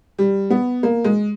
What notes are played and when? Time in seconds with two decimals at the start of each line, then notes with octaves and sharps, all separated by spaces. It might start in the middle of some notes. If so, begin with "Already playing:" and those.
0.19 G3
0.50 B3
0.83 A#3
1.04 G#3